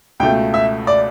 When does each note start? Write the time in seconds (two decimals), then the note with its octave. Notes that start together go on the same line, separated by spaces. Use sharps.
0.20 C#2 B2 A3 G5
0.54 E5
0.87 D5